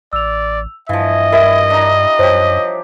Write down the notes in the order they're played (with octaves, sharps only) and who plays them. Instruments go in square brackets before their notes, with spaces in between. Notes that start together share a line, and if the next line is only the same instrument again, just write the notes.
[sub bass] A1 [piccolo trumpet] D5 [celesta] E6 F7
[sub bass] G2 [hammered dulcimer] E3 F3 [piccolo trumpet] D#5 [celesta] F5
[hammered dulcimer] G3 E4 [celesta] A#4 E5 D7
[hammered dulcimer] D4 A#5
[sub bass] F#2 [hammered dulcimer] F3 G4 [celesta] C5 C#5